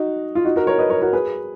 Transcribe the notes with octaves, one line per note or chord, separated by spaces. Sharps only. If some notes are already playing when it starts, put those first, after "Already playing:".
Already playing: D#4 F#4
F4
D#4 F#4
F#4 A#4
A#4 C#5
B4 D#5
A#4 C#5
F#4 A#4
G#4 B4